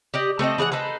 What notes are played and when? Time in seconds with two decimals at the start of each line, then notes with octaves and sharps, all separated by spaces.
0.14 G4 D5 D#5
0.39 A3 C4 A4 D#5
0.58 E3 G#4 C5 F#5
0.72 D#4 A4 B4 C5